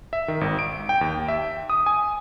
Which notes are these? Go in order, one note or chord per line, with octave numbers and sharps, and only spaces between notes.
E5
D#3
G#1
D7
G5
D#2
E5
D#6
G#5